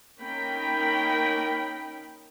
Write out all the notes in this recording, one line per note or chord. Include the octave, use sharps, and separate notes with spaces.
A#3 C#4 D#4 A#4 G5 B5